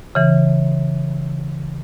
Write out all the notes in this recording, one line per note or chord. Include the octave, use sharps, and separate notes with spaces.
C#3 E3